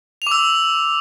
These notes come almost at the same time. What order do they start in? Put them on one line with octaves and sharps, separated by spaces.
F7 D6 E6